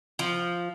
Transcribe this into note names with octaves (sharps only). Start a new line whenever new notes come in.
F3